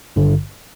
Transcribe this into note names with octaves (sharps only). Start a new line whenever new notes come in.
G#1 G2 D3